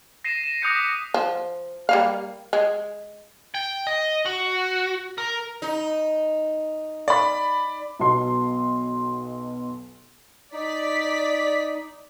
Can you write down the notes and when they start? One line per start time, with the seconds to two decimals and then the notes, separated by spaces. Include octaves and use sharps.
0.24 A#6 C7 D#7 E7
0.44 E7
0.62 D6 D#6 F#6 G6 A#6 C#7
0.75 B6 E7
1.14 F3
1.89 G3 A#3 F5
2.53 G#3
3.55 G5
3.87 D#5
4.26 F#4
5.18 A#4
5.62 D#4
7.08 D5 B5
8.00 B1 B2 A5 C6
10.53 D#4 D5 B6